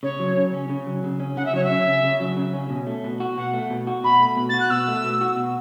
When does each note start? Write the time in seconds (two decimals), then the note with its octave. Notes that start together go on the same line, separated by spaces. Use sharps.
0.03 C#3 C#5
0.19 F#3
0.37 C#3
0.54 C#4
0.69 C#3
0.87 F#3
1.04 C#3
1.20 C#4
1.37 C#3 F#5
1.45 E5
1.53 F#3 C#5
1.64 E5
1.70 C#3
1.87 C#4
2.03 C#3
2.20 F#3
2.37 C#3
2.54 C#4
2.70 B2
2.87 A3
3.04 B2
3.20 F#4
3.37 B2 F#5
3.53 A3
3.70 B2
3.87 F#4
4.04 B2 B5
4.20 A3
4.37 B2
4.49 F#4 A6
4.60 F#6
4.70 B2 E6
4.88 A3
5.04 B2
5.21 F#4
5.37 B2